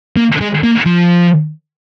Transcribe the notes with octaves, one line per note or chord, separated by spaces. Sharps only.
A#3
G#3
A#3
F3